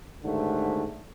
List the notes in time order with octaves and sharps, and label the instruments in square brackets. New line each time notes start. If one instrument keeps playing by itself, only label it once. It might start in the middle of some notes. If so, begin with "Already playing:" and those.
[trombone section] D#2 G#2 D3 A3